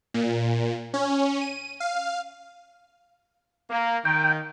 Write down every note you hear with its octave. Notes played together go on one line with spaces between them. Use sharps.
A#2
C#4
D#7
F5
A#3
D#3 G5